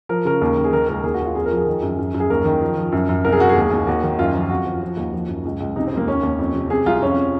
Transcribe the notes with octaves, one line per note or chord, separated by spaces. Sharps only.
F3 A#4
C#3 A#4
D#2
D#3
G#4
D#3 A#4
C#2 A#4
D#2 G#4
F#4
D#2 F4
F2 G#4
A#4
F3
G#4
D#3
F#2
F#2
F#2
G#4
D#2 A#4
D#3
F3
F3
F#2
F#2
C2 A#4
G#4
C2 F#4
G#4
D#2
D#2
D#2 F#4
D#3
F#2 F4
F3
F2 F#4
F3
F3
D#2
F3
F#2
C#2
C#2
C3 D#4
C4
F2
A#3
D#2 C#4
D#2
F2
C3
C3 G#4
C2 F4
F2 C#4